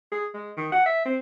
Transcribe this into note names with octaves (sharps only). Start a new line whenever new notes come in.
G#4
G#3
D#3
F#5
E5
C4